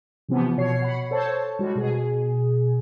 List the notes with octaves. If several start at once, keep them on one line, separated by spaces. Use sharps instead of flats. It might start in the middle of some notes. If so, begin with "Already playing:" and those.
C3 E3 F3 B3
B2 C#5 C7
F#5 B5
A4 C5 C#5 A5
G3 G#3 F#4
B2 G#4